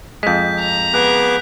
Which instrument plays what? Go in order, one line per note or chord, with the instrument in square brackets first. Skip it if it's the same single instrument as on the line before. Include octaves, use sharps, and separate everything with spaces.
[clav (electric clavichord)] F2 G#3 [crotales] G6 B6
[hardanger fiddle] A#5
[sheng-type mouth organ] B3 G#4 D6 [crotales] F#6